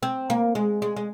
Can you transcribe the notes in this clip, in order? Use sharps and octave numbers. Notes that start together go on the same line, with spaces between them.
C4
A#3
G#3
G#3
G#3